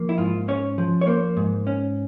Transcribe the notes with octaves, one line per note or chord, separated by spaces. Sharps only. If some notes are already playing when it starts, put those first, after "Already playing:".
Already playing: F3 A#3
E4
G#2 F4
C#4 C#5
F3
C#5
A#3 C5
G#2
C#4